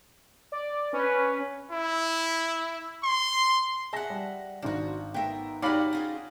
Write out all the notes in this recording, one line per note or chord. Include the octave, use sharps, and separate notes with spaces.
D5
C#4 B4
E4
C6
G#4 E5 F#5 A5 A#6
G3
G#1 F3 D4 F#4
B3 A#4 E5 F5 G5
D#4 F#4 G4 C#5 D5 F5 F#5 B5
C#4 F4 G#4